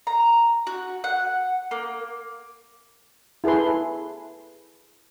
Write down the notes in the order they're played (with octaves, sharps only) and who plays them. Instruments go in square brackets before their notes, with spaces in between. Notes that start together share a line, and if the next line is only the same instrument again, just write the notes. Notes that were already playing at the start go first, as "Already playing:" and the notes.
[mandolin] A#5
F#4
F#5
A#3
[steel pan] E4 G#4 A4 B4 C6